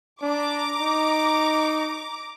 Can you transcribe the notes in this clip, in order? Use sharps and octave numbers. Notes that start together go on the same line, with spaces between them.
D4 A#5 D6
D#4